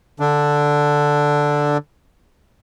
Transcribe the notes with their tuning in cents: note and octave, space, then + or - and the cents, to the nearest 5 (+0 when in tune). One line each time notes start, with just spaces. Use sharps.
D3 +0 D4 +0